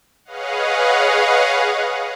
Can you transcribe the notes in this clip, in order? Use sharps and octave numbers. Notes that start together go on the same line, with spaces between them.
G#4 B4 C#5 D#5 F5 F#5